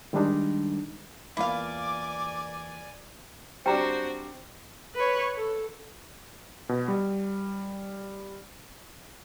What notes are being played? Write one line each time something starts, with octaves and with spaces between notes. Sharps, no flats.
D#3 G3 G#3 D4 D#4
E2 A#3 E4 F4 D5 F5 G#5 D6
G3 C4 D4 F#4 C5 G5 A#5
B4 C#5
A4
B2
G3